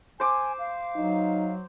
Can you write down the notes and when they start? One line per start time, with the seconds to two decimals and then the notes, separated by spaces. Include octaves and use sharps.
0.20 C5 G#5 D6
0.59 F5
0.96 F#3 D#4